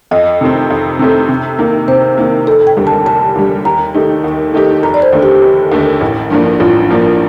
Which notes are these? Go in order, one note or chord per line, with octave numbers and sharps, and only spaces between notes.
F2 D#5
C3 D#3 A3 C4
F2
C3 D#3 A3 C4
C3
D#3 A#3
C3 C5
D#3 A#3
F1 A4
G5
D#2 D3 G3
A5
F1 A5
D#2 D3 G3
D#2 A#5
D#3 A3 D#4 G4
D#2
D#3 A3 D#4 G4
F1 A#5
D5
C5
D#2 D3 A3
G4
F1
D#2 D3 A3
A1
G2 F3 A#3 D4
A1 F4
G2 F3 A#3 D4